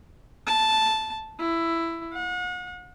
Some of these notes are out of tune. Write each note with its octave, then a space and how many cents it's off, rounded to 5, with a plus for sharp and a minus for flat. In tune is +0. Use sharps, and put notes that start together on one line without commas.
A5 -5
E4 +10
F#5 -40